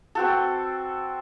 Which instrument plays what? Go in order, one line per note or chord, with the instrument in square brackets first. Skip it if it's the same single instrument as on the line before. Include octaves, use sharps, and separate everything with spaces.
[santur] C4 F#4 A4